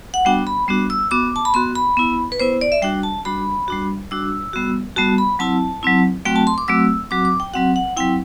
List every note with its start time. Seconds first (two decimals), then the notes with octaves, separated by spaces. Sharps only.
0.14 F#5
0.25 G3 B3 D4 F#4 G5
0.47 B5
0.68 G3 B3 D4 F#4
0.90 E6
1.11 B3 F#4 D6
1.36 A5
1.45 B5
1.54 B3 F#4 C6
1.75 B5
1.97 B3 E4
2.32 B4
2.39 B3 E4 C5
2.61 D5
2.72 E5
2.82 G3 D4 F#4 G5
3.03 A5
3.25 G3 D4 F#4 B5
3.68 G3 D4 F#4
4.11 G3 D4 F#4 E6
4.53 G3 B3 F#4
4.96 G3 B3 F#4 A5
5.18 B5
5.39 F#3 C4 E4 A5
5.83 F#3 C4 E4
6.25 F#3 A3 C4 F#4 G5
6.36 A5
6.47 C6
6.58 D6
6.68 F#3 A3 C4 F#4 E6
7.11 F#3 C4 F#4 D6
7.25 D6
7.40 G5
7.53 F#3 C4 F#4 F#5
7.76 F#5
7.97 F#3 C4 E4 G5